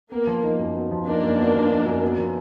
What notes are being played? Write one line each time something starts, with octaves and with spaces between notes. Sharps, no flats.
A#3 B3
F3
D#4
F#2
B3
F3
A#3 D4 D#4
F#2
B3
F3
D#4
F#2
B3
F3